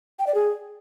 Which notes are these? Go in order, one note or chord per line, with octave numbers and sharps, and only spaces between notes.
G5
D5
G#4